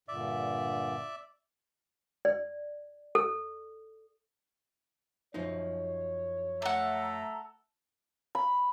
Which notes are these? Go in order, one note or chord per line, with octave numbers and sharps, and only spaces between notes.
G2 A#2 D3 D5 E5
D5
A4
F#2 F3 D#4 C#5
A3 A4 E5 F#5 A#5
B5